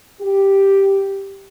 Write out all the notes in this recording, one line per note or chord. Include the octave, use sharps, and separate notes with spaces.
G4